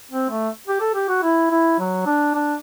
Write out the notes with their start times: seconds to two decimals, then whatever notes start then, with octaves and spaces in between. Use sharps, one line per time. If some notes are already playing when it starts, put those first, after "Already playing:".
0.12 C4
0.30 A3
0.67 G4
0.81 A4
0.95 G4
1.09 F#4
1.23 E4
1.51 E4
1.79 F#3
2.06 D4
2.35 D4